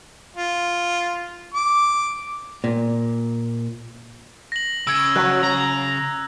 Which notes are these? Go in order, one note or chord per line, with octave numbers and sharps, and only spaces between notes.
F4
D6
A#2
A#6 F#7
C#3 E6 G#6 D7
F#3 F#6
A#5